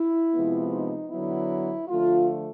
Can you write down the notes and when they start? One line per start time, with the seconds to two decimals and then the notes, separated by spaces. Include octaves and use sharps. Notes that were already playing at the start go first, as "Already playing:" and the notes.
Already playing: E4
0.33 C3 F3 G#3 B3
0.71 D#4
1.10 D3 F#3 B3 E4
1.88 D3 F3 A3 F4